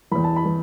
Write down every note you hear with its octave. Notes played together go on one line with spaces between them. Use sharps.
E2 E3 B5
A5
B5
E3